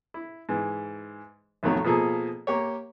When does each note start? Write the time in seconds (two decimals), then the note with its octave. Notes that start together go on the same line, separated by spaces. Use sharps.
0.14 E4
0.49 G#2 E3
1.63 B1 F2 D#3 F#3 A3
1.84 B2 F3 A#3 G#4 A4
2.47 A#3 G4 C#5